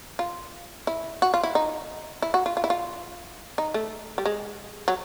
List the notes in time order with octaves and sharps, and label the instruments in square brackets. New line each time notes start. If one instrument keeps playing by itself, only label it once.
[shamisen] F4
E4
F#4
F4
E4
D#4
E4
F#4
F4
F4
E4
F4
D#4
A3
G3
G#3
F#3